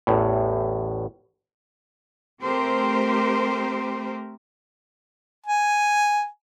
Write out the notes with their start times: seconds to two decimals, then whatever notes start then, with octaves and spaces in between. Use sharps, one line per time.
0.07 A1 E2 A2
2.44 A3 C4 G4 A#4 C5
5.46 G#5